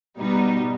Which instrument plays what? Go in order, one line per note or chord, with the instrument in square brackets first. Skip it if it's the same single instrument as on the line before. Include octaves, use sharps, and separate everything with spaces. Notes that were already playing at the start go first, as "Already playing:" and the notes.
[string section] B2 G3 B3 D#4